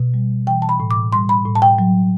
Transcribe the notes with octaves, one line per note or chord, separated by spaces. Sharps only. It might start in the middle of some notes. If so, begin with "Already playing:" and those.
Already playing: B2
G3
E3 G5
A5
B5
A2
D6
G3 C6
B5
A2
A5
G5
F#3